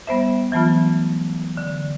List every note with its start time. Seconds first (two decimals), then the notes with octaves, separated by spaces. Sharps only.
0.07 G3 B3 C5 E5
0.52 E3 F#3 A3 B3 F4
1.57 D3